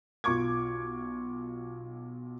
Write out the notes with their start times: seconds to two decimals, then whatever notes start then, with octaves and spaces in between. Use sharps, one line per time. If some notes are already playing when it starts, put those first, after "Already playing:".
0.24 B1 F4 C#6 D6 G#6